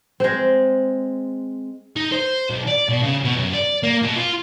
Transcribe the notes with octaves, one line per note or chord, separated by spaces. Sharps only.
G#3 C4
D#4
C5
B1
D5
B2
C#3
B2
F#2
D5
A#3
B2
F4